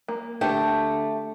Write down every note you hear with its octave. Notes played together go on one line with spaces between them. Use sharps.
A#3
D3 A3 G4